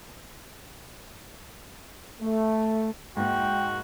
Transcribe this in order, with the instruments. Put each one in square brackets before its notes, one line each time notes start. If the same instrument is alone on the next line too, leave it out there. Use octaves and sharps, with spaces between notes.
[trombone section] A3
[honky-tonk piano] G#2 A#3 [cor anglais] F#4 [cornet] G5